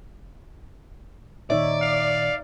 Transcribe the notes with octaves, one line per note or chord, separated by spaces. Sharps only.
A#2 D#3 D#4 C#5 D5 E5
F5